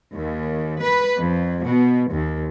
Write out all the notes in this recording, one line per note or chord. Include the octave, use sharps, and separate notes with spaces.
D#2
B4
F2
B2
D#2